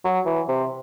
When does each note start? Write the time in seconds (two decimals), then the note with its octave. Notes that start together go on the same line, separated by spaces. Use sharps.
0.05 F#3
0.26 E3
0.48 C3